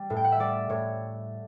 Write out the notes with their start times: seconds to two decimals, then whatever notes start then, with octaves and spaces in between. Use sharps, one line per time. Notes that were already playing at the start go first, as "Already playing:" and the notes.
Already playing: G3
0.10 A2
0.17 G5
0.24 F#5
0.32 E5
0.39 G3 D5
0.70 A2 C#5